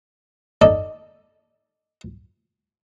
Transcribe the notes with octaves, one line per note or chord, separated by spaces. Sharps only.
D#4 A4 D5